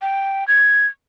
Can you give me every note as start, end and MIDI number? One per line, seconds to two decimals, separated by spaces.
0.02 0.46 79
0.48 0.86 92